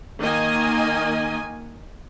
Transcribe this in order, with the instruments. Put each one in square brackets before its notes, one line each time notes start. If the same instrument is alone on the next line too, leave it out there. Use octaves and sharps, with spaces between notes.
[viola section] D#3 A#3 D#5 G#5